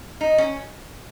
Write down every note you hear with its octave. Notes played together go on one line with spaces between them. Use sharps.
D#4
C#4